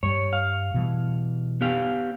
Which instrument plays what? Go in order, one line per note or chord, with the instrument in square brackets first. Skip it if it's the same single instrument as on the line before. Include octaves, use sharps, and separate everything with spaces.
[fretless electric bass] G2 G3 [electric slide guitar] C#5
[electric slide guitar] F5
[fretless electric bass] B2 E3 G3
[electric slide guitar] B3 G4 F5